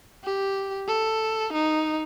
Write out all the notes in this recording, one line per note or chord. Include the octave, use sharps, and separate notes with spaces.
G4
A4
D#4